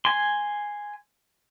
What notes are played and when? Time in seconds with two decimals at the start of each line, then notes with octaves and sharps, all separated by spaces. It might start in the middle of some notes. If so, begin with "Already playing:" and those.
0.05 G#5 C6